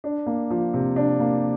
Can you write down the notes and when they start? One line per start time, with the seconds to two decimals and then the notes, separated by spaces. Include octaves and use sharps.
0.04 D4
0.26 A#3
0.50 F3
0.73 C3
0.96 D4
1.20 A#3